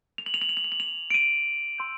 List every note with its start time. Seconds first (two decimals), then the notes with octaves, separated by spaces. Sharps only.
0.18 F7
0.26 F#7
0.34 F7
0.41 F#7
0.49 F7
0.57 F#7
0.64 F7
0.72 F#7
0.80 F7
1.10 D7
1.14 D#7
1.78 C6 E6 G6